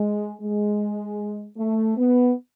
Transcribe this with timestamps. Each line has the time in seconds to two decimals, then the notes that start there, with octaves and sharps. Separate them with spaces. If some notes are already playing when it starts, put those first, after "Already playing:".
Already playing: G#3
0.41 G#3
1.58 A3
1.97 B3